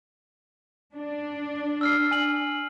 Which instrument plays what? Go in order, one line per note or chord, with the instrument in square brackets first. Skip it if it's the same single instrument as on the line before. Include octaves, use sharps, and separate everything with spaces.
[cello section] D4
[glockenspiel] E6 F6 C7
G#5 F#7